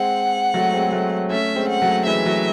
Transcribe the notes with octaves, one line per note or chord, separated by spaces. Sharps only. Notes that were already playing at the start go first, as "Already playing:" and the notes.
Already playing: G#3 C4 F#5
F#3 A3
G#3 C4
G#3
F#3 A3
A3 C#4 E5
G#3 C4
F#5
F#3 A3
E3 G#3 E5
F#3 A3